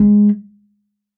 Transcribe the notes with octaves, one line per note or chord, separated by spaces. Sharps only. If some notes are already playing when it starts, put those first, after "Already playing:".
Already playing: G#3